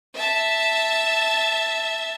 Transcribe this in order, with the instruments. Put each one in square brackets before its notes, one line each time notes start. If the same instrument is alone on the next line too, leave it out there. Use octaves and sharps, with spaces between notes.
[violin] E5 A5